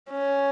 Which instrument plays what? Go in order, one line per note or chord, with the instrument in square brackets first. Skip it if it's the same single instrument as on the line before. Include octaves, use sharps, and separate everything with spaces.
[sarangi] C#4